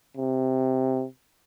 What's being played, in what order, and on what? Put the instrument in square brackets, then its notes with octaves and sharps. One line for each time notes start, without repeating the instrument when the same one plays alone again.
[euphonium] C3